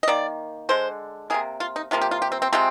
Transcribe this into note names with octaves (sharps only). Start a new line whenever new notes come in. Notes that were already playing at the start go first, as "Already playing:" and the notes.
D#5
D#3 A#3 D5
D3 G#3 C5
C3 D#3 A#3 G#4
F4
D#4
C3 F3 A#3 F4
G4
F4
G4
C4
C4
C3 F3 G#3 C4